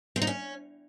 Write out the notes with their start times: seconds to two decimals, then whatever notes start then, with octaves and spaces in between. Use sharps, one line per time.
0.16 C4
0.22 D#4
0.27 C#4